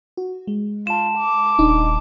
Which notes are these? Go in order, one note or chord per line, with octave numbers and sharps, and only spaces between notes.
F#4
G#3
F4 A5 E7
D6
D#1 D4 D#4 D#5